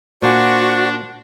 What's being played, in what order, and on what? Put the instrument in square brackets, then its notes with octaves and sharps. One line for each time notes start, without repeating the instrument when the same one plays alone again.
[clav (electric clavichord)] A#2 A#3 G#5 [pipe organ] D4 [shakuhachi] F#4 [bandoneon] C5 D5 C#6